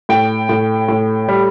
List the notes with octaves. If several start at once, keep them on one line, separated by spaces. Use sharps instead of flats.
A2 G5
A2
A2
G3